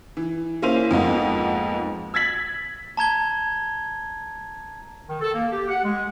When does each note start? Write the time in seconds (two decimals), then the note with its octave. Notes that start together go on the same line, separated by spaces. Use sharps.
0.17 E3
0.62 A#3 C#4 E4 C5 D#7 F7
0.91 F2 G#2 A#3 B3
2.14 E6 G#6 A6 B6 F#7
2.97 A5 A#5 G#6 G7
5.08 D#3
5.21 A4
5.33 A#3
5.51 G4
5.69 F#5
5.84 G#3